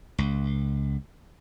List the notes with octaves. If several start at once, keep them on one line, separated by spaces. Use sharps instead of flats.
C#2